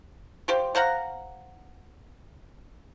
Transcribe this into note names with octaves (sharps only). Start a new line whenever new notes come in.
F4 G4 C5
C5 F5 F#5 A#5